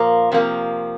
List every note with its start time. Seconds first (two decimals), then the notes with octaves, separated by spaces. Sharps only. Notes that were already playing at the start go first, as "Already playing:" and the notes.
Already playing: A#2 F3 A#3
0.32 C3 F3 A#3